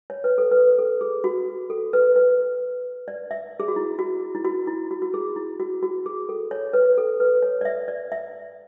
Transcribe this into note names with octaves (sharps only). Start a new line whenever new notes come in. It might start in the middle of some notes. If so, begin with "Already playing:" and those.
C#5
B4
A4
B4
A4
G#4
F#4
A4
B4
B4
D5
E5
G#4
F#4
E4
F#4
E4
F#4
E4
F#4
F#4
G#4
E4
F#4
F#4
G#4
A4
C#5
B4
A4
B4
C#5
D5
E5
D5
E5